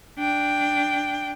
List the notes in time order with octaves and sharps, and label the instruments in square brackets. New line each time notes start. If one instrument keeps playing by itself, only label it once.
[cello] D4 G5